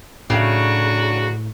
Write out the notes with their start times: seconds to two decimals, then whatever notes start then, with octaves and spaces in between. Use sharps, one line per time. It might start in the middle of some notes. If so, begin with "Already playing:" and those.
0.30 A2 C#3 F#3 D4 F#4